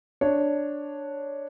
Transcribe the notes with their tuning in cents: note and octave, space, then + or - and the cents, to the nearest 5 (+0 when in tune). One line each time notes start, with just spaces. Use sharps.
D4 +0 C#5 +0